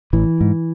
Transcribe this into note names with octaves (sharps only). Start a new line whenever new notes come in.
A1 E3
G#2